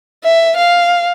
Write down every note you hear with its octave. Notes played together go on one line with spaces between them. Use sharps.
E5
F5